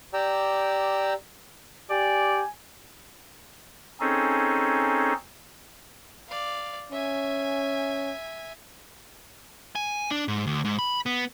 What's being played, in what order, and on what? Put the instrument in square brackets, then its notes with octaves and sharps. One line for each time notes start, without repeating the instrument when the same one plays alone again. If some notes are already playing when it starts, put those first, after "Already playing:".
[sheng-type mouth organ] G4 D5 G5 A#5 E6
[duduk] G4 [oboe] D5 [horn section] G#5
[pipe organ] C4 C#4 D#4 G#4 A4
[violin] D5 F5
[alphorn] C#4 [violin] E5 G#5
[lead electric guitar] G#5
D4
G#2
D2
G#2
B5
B3